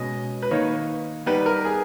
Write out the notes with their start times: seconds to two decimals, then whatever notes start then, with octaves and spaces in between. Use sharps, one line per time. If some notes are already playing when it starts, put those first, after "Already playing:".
Already playing: B2 G#3 C#4 D#5
0.43 B4
0.51 D#3 A#3 D#4 C#5
1.26 G3 B3 D#4 G4 B4
1.46 A#4
1.65 G#4